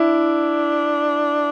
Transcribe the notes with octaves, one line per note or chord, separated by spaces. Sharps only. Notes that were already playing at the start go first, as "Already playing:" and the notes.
Already playing: D4 E4